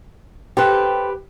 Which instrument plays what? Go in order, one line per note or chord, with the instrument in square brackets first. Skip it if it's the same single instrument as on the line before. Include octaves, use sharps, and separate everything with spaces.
[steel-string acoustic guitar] G4 B4 [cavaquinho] A4 C5 G5